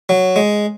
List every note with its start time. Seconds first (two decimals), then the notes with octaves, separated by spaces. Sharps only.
0.09 F#3
0.36 G#3